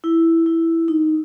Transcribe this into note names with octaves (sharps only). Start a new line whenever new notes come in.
E4
E4
D#4